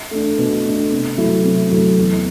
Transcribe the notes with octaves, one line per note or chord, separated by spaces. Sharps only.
A3 D4
B2
A3 D4
C3
F#3 A3 E4
C3
F#3 A3 E4
E2